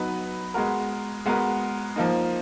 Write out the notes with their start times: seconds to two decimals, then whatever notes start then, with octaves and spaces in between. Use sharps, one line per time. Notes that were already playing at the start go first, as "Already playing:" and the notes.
Already playing: F#3 B3 D#4 F#4 B4
0.54 G#3 B3 F#4 A#4
1.26 G#3 B3 F#4 A#4
1.96 F3 A#3 D#4